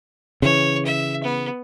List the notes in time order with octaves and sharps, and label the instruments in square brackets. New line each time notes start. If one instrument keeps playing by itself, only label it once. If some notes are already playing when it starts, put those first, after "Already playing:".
[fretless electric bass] C#3 E3 [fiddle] C#5
[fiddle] E5
B3